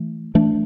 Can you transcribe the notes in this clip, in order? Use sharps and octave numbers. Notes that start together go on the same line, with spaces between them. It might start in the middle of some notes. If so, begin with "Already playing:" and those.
Already playing: E3 A3
E3 A3 D4